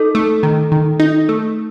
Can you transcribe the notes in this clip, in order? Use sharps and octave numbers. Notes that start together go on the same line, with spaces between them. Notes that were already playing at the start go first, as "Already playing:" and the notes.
Already playing: D#4 A4
A3
D#3
D#3
D#4
A3